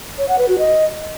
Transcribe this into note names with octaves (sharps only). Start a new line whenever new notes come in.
C#5
F#5
B4
F#4
D#5